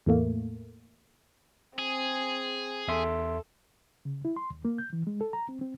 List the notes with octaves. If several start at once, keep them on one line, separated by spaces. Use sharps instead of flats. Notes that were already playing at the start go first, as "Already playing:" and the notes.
E2 A2 A3 A#3
C4 G#4
E2 A4 E5 C6
C#3
E4
C6
D#2
A#3
G6
E3
G#3
A4
A#5
C4
C4